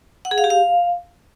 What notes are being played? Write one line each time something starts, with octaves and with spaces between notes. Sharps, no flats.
F#5
G#4
F5
G4
F5